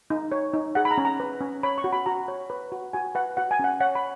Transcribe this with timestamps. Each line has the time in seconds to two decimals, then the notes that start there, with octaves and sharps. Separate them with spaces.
0.10 D#4
0.32 C#5
0.54 D#4
0.75 G#4 F#5
0.85 B5
0.91 A#5
0.98 C#4
1.05 A#5
1.20 B4
1.41 C#4
1.63 C#5 B5
1.78 C#6
1.84 F#4
1.92 B5
2.06 F#4 A#5
2.28 C#5
2.50 B4
2.72 F#4
2.93 F#4 G#5
3.15 B4 F#5
3.37 F#4 F#5
3.51 G#5
3.59 C#4 F#5
3.80 C#5 F#5
3.95 B5